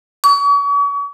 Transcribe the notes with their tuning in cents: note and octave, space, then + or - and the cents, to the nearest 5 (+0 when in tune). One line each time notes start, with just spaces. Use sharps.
C#6 +40